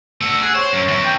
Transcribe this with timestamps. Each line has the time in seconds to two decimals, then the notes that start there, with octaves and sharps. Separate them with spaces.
0.21 A3 F#5 E6
0.42 G#4 F#5
0.55 C5 C#5
0.73 F#2
0.88 E2
1.04 G5